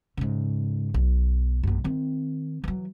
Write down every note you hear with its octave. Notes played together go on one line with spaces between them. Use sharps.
G#2 C#3
B1
A#1 F#2
D#3 C4
E3 F#3